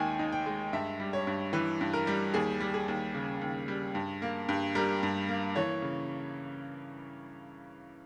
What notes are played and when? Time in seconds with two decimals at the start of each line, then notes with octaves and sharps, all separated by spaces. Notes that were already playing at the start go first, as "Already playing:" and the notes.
Already playing: D#2 D#3 G#3 G5 G#5
0.19 D#4
0.32 G5
0.46 G#3
0.73 G2 E5
1.00 G3
1.13 C#5
1.27 G2
1.53 E3 B4
1.81 G2
1.93 A#4
2.07 G3
2.34 D#2 G#4
2.60 G3
2.74 G#4
2.88 D#2
3.14 C#3
3.41 D#2
3.68 G3
3.95 G2
4.22 A#3
4.49 G2
4.75 G3 A#4
5.03 G2
5.29 A#3
5.56 E3 C#5
5.82 C#3